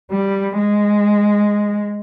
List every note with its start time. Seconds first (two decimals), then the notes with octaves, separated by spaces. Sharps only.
0.11 G3
0.58 G#3